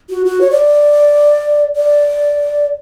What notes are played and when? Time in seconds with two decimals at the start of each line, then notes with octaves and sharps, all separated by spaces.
0.10 F#4
0.26 F#4
0.41 C#5
0.51 D5
1.76 D5